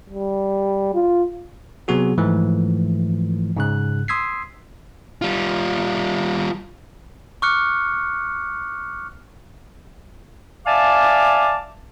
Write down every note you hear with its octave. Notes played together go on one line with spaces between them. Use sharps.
G3
F4
C3 F#3 B3 F#4 G#4
G#2 E3 F3 A3
G#2 C#3 F#6
C6 D#6 E6 G#6 B6 C7
G3 F4
C#6 D6 F6 F#6 C#7
D5 E5 F5 G#5 A5 D6